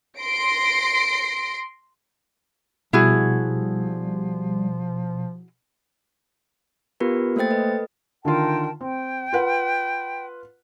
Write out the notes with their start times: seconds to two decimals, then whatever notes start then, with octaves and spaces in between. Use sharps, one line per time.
0.19 C6 A#6 C7 D7
2.93 B2 F3 G3 E4 F#4 G#4
7.00 B3 F4 G4 A#4 B4
7.36 A3 A#3 A4 C5 G5 A6
7.50 A4 B4 D#5
8.25 D3 D#3 F4 A#4 G5 A5
8.81 C4 G5
9.33 F4 B4 F#5